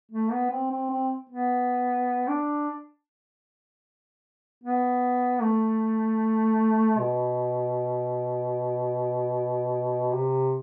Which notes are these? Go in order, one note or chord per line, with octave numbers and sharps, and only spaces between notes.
A3
B3
C4
C4
C4
B3
D4
B3
A3
B2
C3